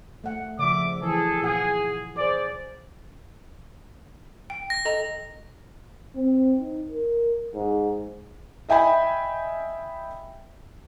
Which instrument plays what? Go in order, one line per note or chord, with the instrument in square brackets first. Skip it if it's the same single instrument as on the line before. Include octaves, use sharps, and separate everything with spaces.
[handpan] A3 F#5
[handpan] C#3 F3 [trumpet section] D5 E5 D6
[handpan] E3 [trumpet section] G#4 A4
[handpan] A#2 F4 F#5 [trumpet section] G#4
[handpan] G#4 C5 [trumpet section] D5
[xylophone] G5
[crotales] A#6
[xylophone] A4 D#5 A#5
[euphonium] C4
D#4
A#4
G#2
[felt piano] D#5 E5 G5 G#5 B5